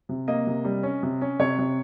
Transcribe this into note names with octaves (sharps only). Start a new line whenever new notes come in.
C3
A#3 D#5
C3
G3
C#4
C3
C#4
C3 C#5
C3